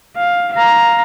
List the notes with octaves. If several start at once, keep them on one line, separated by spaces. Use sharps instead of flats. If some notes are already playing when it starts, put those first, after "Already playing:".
F5
F5 A#5